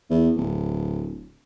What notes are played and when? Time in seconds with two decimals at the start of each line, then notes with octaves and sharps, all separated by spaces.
0.10 E2
0.37 D1